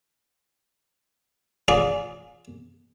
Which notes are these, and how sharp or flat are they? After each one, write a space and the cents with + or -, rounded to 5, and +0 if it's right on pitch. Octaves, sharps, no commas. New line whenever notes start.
F4 +35 G#4 +0 D5 -20